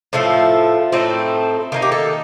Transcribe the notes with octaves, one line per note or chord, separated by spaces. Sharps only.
A2 F3 A3 F4
A2 A3 C4 D#4
D#3 A#3 D#4 F4
G4
A4